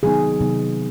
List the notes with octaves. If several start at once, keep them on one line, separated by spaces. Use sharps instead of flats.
C3 D#3 F#3 B3 D#4 G#4
C3 D#3 F#3 B3 D#4